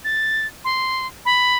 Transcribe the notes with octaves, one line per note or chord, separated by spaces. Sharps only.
A6
C6
B5